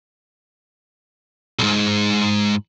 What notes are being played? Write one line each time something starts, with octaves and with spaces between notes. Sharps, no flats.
B1 G#2